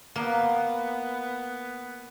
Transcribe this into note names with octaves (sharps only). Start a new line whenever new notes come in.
A#3 B3